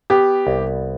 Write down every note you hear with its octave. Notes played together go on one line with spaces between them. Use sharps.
B3 G4
C2